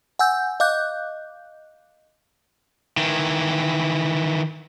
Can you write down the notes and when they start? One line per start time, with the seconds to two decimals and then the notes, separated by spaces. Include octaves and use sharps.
0.19 F#5 G#5 E6 G6
0.60 D#5 F5 D6 F#6 G6
2.97 D#3 E3